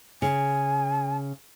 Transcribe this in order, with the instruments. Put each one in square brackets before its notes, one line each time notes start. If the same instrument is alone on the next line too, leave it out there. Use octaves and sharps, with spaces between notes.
[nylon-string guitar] C#3 [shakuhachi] G#5